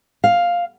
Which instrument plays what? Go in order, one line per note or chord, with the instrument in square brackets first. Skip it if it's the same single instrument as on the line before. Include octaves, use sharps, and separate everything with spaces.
[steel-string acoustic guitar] F5